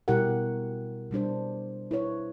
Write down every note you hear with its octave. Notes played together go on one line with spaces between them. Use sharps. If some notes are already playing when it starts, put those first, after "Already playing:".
B2 G3 E4 G4 A#4 F#5
B2 G3 D4 C5
E4 B4 C#5